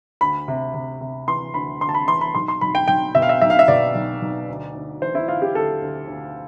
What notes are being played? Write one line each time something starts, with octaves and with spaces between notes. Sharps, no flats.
D2 B5
C3
C3
C3
E3 C6
D2 B5
D2 C6
A5
B5
E3 C6
B5
B1 C6
C6
B1 B5
G5
B1 G5
B2 E5
F5
E5
B1 E5
F5
E5
B2 D5
B1
B1
D2
D2
E3 C5
E4
D2 F4
G4
D2 A4
D2
D2